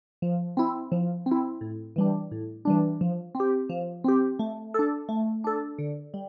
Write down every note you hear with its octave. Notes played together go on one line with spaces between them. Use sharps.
F3
C4 E4
F3
C4
E4
A2
E3 G3 D4
A2
E3 G3 D4
F3
C4
G4
F3
C4 G4
A3
D4 A4
A3
D4 A4
D3
G3